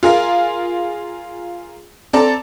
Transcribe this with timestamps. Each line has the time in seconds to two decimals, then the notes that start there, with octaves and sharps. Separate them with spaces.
0.03 F4 G#4 A#4 F5
2.13 C4 A4 D5 A5 A#5